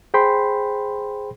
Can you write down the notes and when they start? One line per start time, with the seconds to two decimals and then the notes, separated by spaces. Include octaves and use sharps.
0.14 G#4 C5 G5 B5 C6